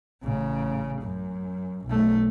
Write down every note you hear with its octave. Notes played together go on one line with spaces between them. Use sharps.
A1 C#3
F#2
B1 A3